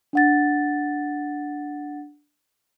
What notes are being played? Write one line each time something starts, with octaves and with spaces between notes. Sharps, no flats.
D4 F#5 A6